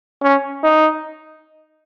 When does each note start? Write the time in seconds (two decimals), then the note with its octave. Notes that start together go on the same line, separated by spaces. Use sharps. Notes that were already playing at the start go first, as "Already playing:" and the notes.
0.22 C#4
0.64 D#4